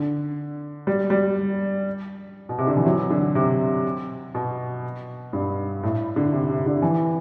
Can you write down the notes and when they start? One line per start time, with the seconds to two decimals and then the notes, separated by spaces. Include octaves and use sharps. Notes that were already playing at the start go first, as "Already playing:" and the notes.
Already playing: D3
0.87 G3
1.10 G3
2.49 B2
2.59 C3
2.67 D3
2.77 E3
2.86 F#3
3.11 D3
3.35 C3
4.35 B2
5.33 G2
5.83 A2
6.16 D3
6.33 C3
6.49 C3
6.66 D3
6.82 E3